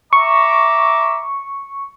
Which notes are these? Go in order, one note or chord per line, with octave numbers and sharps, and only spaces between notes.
E5 A#5 C#6 D6